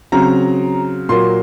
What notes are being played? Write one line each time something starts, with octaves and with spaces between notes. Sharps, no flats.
C#3 F#3 C4 A#5
A#2 F#3 A#3 C6